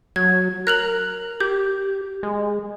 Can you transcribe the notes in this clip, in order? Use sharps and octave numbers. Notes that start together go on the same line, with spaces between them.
F#3 G#6
A#4 F#6 F7 F#7
G4 G6
G#3